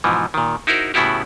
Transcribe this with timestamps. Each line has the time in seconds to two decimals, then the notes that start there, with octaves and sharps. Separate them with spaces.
0.04 G#2 B2 E3 F3
0.34 A#2 D#3
0.67 D#4 E4 F#4 A#4 C5
0.94 A2 C#3 B3 E4 F#4 G4